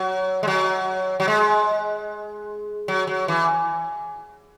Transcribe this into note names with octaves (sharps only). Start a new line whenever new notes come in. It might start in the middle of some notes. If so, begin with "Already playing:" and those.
Already playing: F#3
G#3
F#3
F#3
G#3
F#3
F#3
E3